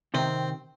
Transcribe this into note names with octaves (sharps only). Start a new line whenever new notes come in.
C3 D#3 C4